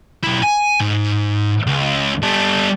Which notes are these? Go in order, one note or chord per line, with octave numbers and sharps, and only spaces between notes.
B1 E4
G#5
G#2
C#2
G3 A4